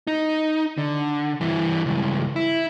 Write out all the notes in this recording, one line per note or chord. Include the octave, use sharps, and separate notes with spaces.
D#4
D3
G2 E3
C#2 G2
E4